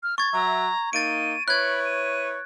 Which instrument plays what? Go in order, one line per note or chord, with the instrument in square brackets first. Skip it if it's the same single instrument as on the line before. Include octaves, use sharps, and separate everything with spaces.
[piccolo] F6
[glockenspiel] C#6 G#6 [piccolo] A6
[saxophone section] F#3 E5 [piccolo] A#5
[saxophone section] A#3 D#4 [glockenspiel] A6 D7 [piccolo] D#7
[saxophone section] E4 B4 C#5 [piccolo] B5 [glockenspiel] F#6 G#6
[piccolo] D#7